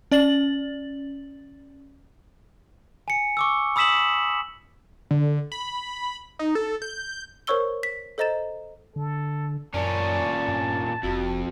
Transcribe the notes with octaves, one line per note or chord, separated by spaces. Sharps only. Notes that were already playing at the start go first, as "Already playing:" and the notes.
C#4 D5 A6 F#7
G#5 C#7
C#6 D6 E6
B5 D#6 E6 B6 E7 F#7
D3
B5
D#4
A4
G6
A#4 C5 C#5 C#6 E6 G7
B6
A4 C5 D#5 A#5 A6 E7
D3 A4
F#2 A#2 C#4 D5 A5
G2
F1 F2 F#4